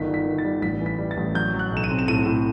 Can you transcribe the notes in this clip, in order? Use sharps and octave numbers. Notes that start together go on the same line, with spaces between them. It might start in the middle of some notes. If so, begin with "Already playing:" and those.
Already playing: G1 D#3 B6
G3
B6
D#3
A6
G3
A1 B6
E3
B6
G3
A6
A1
F#3 G6
F#3
F#6
B1 E7
D#7
C4
E7
A2 D#7
A2